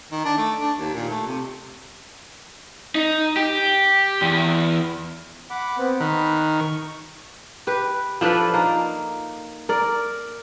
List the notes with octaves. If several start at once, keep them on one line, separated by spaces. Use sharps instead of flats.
D#3
D4
A3
D4
D#2
A#2
A3
C3
D#4
G4
E2
F#5 B5 D6
B3 C4
D#3 B5 F#6
C#6
G4 B4
F3 D4 A4 B4
A#3 D#4
A#4 D5